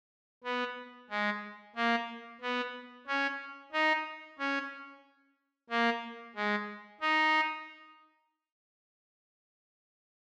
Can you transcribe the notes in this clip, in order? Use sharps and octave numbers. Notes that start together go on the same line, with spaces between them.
B3
G#3
A#3
B3
C#4
D#4
C#4
A#3
G#3
D#4